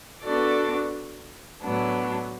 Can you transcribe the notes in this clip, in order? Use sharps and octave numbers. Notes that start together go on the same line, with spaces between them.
B3 D4 F#4 A4 D5
A2 F#3 B3 D4